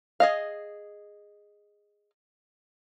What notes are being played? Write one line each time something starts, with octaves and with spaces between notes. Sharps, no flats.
G#4 D#5 F5